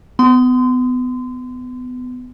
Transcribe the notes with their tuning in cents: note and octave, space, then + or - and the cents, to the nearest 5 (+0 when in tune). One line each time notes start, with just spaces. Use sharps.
B3 +25 C6 -30